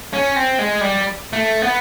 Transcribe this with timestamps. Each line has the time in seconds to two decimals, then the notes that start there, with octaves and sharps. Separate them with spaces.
0.13 C#4
0.36 C4
0.59 G#3
0.81 G3
1.33 A3
1.63 B3